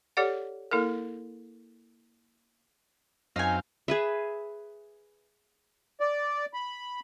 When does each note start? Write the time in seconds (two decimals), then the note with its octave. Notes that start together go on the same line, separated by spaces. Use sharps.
0.17 G4 A4 C#5 D5 F#5
0.71 A#3 E4 A4 A#4
3.36 F#2 C4 D#4 F5 G#5
3.88 G#4 B4 E5
6.00 D5
6.54 B5